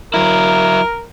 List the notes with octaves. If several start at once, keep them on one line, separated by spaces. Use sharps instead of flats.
F#3 E4 A#4